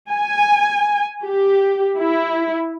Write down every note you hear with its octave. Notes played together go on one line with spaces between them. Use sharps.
G#5
G4
E4